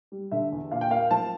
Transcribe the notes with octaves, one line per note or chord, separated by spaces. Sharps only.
G3
D3 E5
E2
A#2 F5
G5
A#3 F5
F3 A5